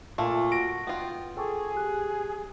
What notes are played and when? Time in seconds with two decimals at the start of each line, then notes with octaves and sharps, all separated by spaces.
0.18 A#2 A3
0.52 F#4 A#6 D7
0.87 B3 F4 G5
1.37 G#4 A4 G5 C#6 D6
1.75 G4 F#6